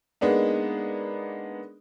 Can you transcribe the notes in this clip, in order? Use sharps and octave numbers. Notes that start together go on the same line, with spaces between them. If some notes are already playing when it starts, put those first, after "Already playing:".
G#3 A#3 B3 D4 D#4